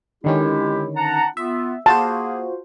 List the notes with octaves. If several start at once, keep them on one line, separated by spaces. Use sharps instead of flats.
D3 D#3 G#3 C#4 E4 G4
F#5 A5 A#5
B3 F4 E5
A#3 F4 F#4 G#4 C5 A5